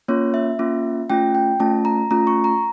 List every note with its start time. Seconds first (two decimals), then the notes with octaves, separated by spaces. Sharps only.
0.08 A#3 C#4 F4 C#5
0.34 E5
0.59 A#3 C#4 F4
1.10 A3 C#4 F4 G5
1.35 G5
1.60 A3 C#4 F4 A5
1.85 A#5
2.11 A3 C#4 F4 A#5
2.27 C#6
2.44 A#5